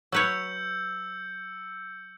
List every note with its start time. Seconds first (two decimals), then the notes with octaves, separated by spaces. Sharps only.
0.12 F#3 B4 C#5 E6 G6 C#7